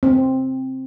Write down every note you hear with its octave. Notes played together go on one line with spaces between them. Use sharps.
C4